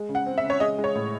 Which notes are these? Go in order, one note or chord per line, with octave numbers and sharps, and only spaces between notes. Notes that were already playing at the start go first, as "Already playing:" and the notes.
Already playing: G#3
C#3
F#5
C4
E5
C#3
C#5
G#3 D#5
G#3
C#5
A2